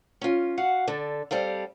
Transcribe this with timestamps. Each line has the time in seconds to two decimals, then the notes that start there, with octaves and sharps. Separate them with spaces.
0.21 C#4 F4
0.57 F#4 F5 F#5
0.87 D3 D4 A4
1.31 G3 C4 A4 F5